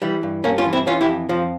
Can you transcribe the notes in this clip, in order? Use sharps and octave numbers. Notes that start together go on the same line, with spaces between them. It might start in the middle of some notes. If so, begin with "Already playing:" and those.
E3 G3
G2
G2 A#3 C#4
C#4 F4
E3
C4 E4
E3 C#4 F4
E4 G4
F2
F2 F3